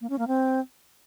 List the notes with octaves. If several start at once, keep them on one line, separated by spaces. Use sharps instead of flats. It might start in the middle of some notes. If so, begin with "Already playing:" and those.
A#3
C#4
A#3
C4